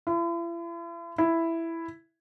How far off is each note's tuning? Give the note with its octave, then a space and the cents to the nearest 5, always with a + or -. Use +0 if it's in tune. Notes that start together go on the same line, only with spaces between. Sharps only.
E4 +45
E4 +5